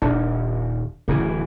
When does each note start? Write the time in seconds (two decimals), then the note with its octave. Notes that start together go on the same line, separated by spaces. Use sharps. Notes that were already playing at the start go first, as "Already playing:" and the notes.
0.02 D#1 D4
1.08 D1 C#3 E3